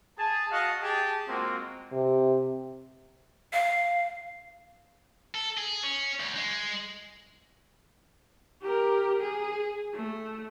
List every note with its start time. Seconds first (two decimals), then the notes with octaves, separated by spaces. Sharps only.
0.18 G#4 A5
0.51 F#4 D#5 F5 F#5 A5
0.82 G4 G#4 A5
1.29 G#3 A#3 C4 F4 F#4
1.92 C3
3.53 F5
5.35 A4
5.57 G#4
5.83 C#4
6.20 D2
6.36 G#3
8.62 G4 A#4
9.21 G#4
9.94 A3